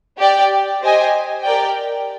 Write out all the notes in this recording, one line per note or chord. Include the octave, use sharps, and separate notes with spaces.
G4 D5 G5
G4 C5 D#5 G#5
G4 A#4 D5 G5